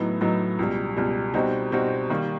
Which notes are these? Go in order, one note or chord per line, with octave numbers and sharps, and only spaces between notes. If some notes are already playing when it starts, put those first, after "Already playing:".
Already playing: A2 F#3 B3 D#4
A2 F#3 B3 D#4
C#2 B2 G3
C#2 B2 G3
B2 G3 C4 D#4 F#4
B2 G3 C4 D#4 F#4
D#3 G3 A#3